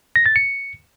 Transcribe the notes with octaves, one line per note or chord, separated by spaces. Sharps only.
A#6
A6
C#7